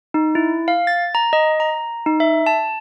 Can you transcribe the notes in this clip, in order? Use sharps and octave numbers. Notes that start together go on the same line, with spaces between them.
D#4
E4
F5
A6
A#5
D#5
A#5
D#4
E5
A5